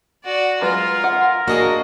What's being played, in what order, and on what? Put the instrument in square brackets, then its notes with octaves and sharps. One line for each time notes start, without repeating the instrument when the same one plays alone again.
[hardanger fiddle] F#4 D5
[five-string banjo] F#3 G#3 B4 [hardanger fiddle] F4 [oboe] A#4
[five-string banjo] F#5
[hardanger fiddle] A#3 [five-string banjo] D4 G#4 [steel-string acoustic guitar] F#4 D#5